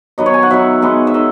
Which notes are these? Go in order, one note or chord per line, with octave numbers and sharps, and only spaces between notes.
D#3 F#3 B3 D#5
C#5
G#5
F#5
D#3 F#3 B3 E5
D#3 G#3 B3 D#5
E5
D#3 D#5